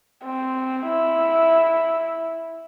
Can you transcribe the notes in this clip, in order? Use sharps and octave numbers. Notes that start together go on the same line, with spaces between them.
C4
E4